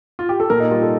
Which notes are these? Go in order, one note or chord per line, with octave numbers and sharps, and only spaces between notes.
F4
G4
A4
A#2 A#4
D#4
G3 F4
A4